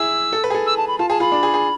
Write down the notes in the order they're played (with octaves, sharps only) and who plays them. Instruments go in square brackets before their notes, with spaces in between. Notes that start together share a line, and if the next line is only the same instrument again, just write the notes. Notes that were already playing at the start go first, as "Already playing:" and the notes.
Already playing: [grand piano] E4 G#4 [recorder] E6
[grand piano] A4
B4
G#4
A4
[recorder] E6
A5
B5
[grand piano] F4 [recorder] A5
[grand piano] G#4 [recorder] A5
[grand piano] F4 [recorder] B5
[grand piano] D4
G#4
G#4